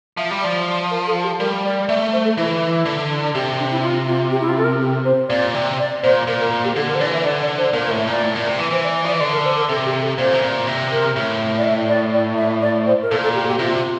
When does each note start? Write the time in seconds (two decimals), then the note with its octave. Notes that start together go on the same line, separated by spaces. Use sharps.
0.17 F3 E5
0.31 G3
0.42 F3 D5
0.91 A#4
1.07 A4
1.23 G4
1.39 G3 A#4
1.64 D5
1.89 A3 E5
2.00 E5
2.13 C5
2.25 A4
2.37 E3 E4
2.62 E4
2.86 D3
3.35 C3 G4
3.59 D4
3.71 E4
3.83 F4
4.08 F4
4.32 G4
4.41 E4
4.49 F4
4.57 A4
4.64 A#4
4.81 G4
5.05 C5
5.29 A#2 D5
5.54 C3
5.79 D5
6.03 A#2 C5
6.27 A#2 A#4
6.40 A#4
6.64 G4
6.76 D3 A4
6.88 A#4
6.95 C5
7.01 E3 D5
7.13 E5
7.25 D3 D5
7.42 D5
7.58 C5
7.73 A#2 A#4
7.86 A#4
7.90 A2
7.98 E5
8.07 A#2 D5
8.23 A2
8.35 A#2
8.46 C3
8.59 E3
8.71 E3 C5
8.83 D5
8.96 E5
9.05 F3
9.07 D5
9.12 E3
9.16 E5
9.20 D3 D5
9.33 A#4
9.45 C5
9.57 A#4
9.69 C3 A4
9.86 G4
10.01 A4
10.18 A#2 C5
10.33 C3
10.42 A#2
10.67 C3
10.91 A#4
11.16 A2
11.58 D5
11.64 E5
11.89 D5
12.13 D5
12.37 E5
12.62 D5
12.86 C5
13.02 A#4
13.11 A#2 A4
13.23 A4
13.35 G4
13.48 G4
13.59 C3 F4
13.76 F4